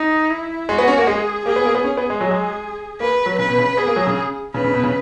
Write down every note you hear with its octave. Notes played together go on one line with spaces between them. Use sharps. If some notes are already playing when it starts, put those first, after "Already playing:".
Already playing: D#4
E4
G#3 F#4
B3
C#4
A#3
G#3 G#4
A#3 G#4
B3
A#3
B3
C#4 G#4
B3
G#3
F#3
G#3
A#3 B4
F#3
C#3 B4
B2
C#3
B3 G#4
A#3
F#3
C#3
C#3 B4
C#3
B2
C#3